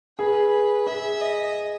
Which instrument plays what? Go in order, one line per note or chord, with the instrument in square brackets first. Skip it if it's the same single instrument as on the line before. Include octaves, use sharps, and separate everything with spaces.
[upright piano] G#4 [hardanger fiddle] B4
[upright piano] G#4 [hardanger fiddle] E5
[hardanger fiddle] D#5